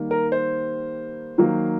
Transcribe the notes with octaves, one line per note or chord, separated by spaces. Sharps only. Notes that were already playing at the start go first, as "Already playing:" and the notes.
Already playing: D#3 G3 A#3
A#4
C5
D#3 F#3 A#3